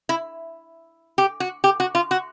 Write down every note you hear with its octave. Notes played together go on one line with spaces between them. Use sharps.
E4
G4
F#4
G4
F#4
F4
F#4